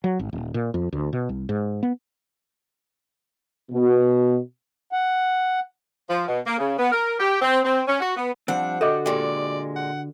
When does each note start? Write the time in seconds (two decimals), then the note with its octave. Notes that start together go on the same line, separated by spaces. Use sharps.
0.04 F#3
0.19 G#1
0.33 D#1
0.54 A#2
0.74 F2
0.93 D2
1.13 B2
1.29 C2
1.49 G#2
1.83 B3
3.72 B2
4.92 F#5
6.10 F3
6.27 B2
6.47 A#3
6.58 C#3
6.79 B3
6.92 A#4
7.20 G4
7.42 C4
7.65 C4
7.88 C#4
8.01 F#4
8.17 B3
8.48 F3 G3 C4 D4 F#5
8.81 D3 F#4 G4 A4 D#5 D6
9.06 A#2 G#3 G4 D5 G5
9.76 F#5